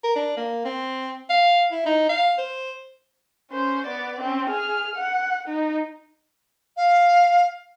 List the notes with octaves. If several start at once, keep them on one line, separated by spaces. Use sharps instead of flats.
A#4
D4
A#3
C4
F5
E4
D#4
F5
C5
C#4 C5
B3 D5
C4 C#4
G#4 F6
F#5
D#4
F5